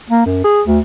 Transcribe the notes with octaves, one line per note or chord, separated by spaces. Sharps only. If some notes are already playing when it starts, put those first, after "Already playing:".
A#3
F#2
G#4
D2